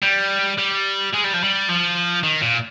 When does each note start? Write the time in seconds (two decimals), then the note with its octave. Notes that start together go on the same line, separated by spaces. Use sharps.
0.03 G3
0.58 G3
1.13 G#3
1.24 G3
1.33 F3
1.43 G3
1.69 F3
2.23 D#3
2.42 A#2